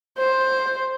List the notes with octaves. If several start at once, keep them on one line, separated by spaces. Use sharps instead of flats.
C5